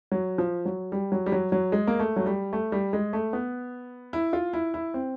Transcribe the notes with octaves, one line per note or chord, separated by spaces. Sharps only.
F#3
F3
F#3
G3
F#3
G3
F#3
F#3
G#3
A#3
A3
F#3
G3
A3
G3
G#3
A3
B3
E4
F4
E4
E4
C4